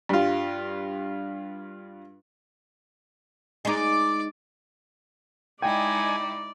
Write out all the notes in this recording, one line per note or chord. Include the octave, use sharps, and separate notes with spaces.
G2 F4
G#3 D#4 D5 D6
G#3 D#4 E4 D5 G5 G#5